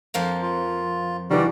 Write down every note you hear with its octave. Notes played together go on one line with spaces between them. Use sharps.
F2 F3 A#3
F4
D#3 E3 G3 F#4 A#4 D5